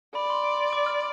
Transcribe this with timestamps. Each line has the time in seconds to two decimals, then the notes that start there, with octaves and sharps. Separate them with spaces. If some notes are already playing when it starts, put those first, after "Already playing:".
0.15 D5 B5
0.30 C6
0.44 D6
0.58 C6
0.73 D6
0.86 F6